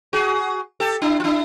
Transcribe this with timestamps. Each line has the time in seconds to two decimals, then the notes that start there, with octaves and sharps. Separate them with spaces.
0.13 F#4 G#4
0.80 G4 A4
1.02 D4 E4
1.20 F4
1.24 D4 E4